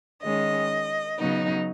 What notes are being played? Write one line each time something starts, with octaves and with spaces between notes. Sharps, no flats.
D#3 G#3 C#4 D#5
C#3 F#3 B3 D#4